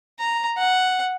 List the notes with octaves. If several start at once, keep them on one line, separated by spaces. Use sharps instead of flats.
A#5
F#5